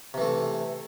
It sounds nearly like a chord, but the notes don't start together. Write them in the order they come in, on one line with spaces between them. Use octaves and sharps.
C3 E3 A3